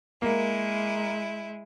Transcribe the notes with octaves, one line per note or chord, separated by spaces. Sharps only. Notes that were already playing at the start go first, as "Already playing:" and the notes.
G#3 A#3 E4